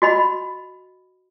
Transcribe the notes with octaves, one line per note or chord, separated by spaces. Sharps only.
F#4 D#5 B5